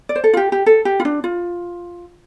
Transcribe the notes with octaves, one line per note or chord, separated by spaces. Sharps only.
D5
C5
A4
F4
G4
G4
A4
G4
F4
D4
F4